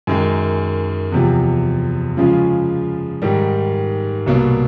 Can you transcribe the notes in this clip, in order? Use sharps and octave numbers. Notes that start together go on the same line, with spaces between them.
F#2 D#3 G#3
E2 C3 F3
C#3 F3 G#3 C#4 F4
G#2 D#3 G3
C2 B2 F#3 A#3